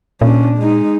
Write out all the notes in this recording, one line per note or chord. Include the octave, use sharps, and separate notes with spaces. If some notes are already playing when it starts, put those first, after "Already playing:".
A#2 C#4 D4
G#3 D#4